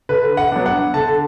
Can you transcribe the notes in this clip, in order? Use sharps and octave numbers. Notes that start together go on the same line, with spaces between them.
D3 B4
F#5
F#3 B3 D4
F#5
D3 A5